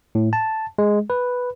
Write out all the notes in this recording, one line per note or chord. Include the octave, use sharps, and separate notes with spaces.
A2
A5
G#3
B4